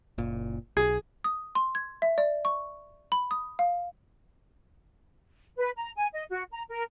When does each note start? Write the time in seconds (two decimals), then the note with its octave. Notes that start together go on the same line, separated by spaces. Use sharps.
0.18 F#1 A#2
0.77 B1 G#4
1.24 D#6
1.55 C6
1.75 G#6
2.02 E5
2.18 D5
2.45 C#6
3.12 B5
3.31 D#6
3.59 F5
5.58 B4
5.77 A#5
5.97 G#5
6.13 D#5
6.29 F#4
6.51 A#5
6.69 A#4